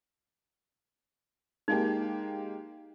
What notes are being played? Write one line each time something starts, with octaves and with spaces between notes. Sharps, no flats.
G#3 A#3 D#4 G4